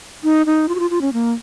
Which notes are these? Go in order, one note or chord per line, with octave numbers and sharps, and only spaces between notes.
D#4
D#4
F4
F#4
F4
F4
C#4
A#3